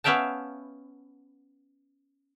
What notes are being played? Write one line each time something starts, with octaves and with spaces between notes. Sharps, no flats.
B3 C#4 E5 F5 G5 A5